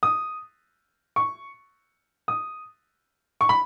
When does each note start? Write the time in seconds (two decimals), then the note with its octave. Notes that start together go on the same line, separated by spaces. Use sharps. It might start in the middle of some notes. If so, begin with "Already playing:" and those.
0.03 D#6
1.16 C#6
2.28 D#6
3.41 C#6
3.49 B5